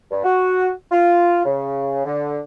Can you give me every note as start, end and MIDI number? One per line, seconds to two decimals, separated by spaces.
0.11 0.24 43
0.24 0.70 66
0.92 1.41 65
1.45 2.05 49
2.05 2.41 50